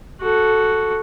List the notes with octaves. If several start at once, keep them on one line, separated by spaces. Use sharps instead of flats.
F#4 A4